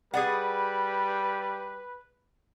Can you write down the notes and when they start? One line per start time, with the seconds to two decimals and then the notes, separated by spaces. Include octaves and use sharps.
0.14 G3 G#4 B4 D5 F#5